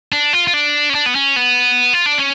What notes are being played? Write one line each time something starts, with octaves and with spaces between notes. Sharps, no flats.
D4
F4
F4
D4
C#4
D4
B3
C#4
B3
F4
D4
C#4